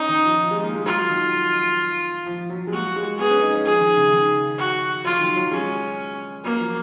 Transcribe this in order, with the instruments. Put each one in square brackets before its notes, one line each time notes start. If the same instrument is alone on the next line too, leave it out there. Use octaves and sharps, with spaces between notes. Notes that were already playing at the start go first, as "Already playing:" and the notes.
Already playing: [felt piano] C#4 [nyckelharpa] D#4
[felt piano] D#3
F3
G#3
A#3
G#3
[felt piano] F#3 [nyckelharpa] F4
[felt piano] D#3
F3
F#3
G#3
[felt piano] A#3 [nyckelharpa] F#4
[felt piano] G#3
[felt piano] B3 [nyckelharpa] G#4
[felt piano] C#4
D#4
C#4
[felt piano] F3 [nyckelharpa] G#4
[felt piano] D#3
C#3
D#3
[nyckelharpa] F#4
[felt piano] F#3 [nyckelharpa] F4
[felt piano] D#3
F#3
[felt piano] G#3 [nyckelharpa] C#4
[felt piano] F#3 [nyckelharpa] A#3
[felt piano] F3